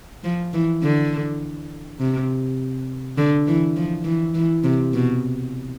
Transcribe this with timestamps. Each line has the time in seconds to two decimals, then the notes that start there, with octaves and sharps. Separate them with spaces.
0.24 F3
0.53 E3
0.83 D3
2.00 C3
3.18 D3
3.47 E3
3.76 F3
4.04 E3
4.34 E3
4.64 C3
4.93 B2